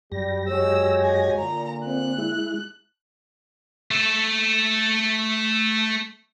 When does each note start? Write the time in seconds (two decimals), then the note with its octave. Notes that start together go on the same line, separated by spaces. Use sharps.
0.12 F#2 G3 G4 A#6
0.49 G#3 F#4 C#5 E6
1.04 G#5
1.38 A#2 D3 A#5
1.86 C4 F#6
2.18 G#3 E4
3.91 A3 A4